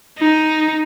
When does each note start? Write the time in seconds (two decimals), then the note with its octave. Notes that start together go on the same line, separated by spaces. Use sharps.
0.19 D#4